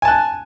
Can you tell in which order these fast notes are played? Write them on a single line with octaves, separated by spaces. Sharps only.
G#5 A5 F#6